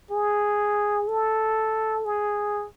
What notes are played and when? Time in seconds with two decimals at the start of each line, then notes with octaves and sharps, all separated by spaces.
0.11 G#4
1.08 A4
2.05 G#4